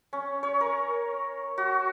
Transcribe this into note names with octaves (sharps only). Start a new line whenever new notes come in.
C#4
C#5
A#4
F#4